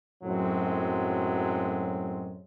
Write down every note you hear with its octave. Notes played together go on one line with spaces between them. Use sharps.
F#2 A2 F#3 G#3 C4